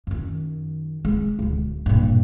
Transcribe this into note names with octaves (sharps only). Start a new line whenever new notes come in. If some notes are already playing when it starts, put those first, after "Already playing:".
F#2 D#3
G#3
D1 D2
G2 A#2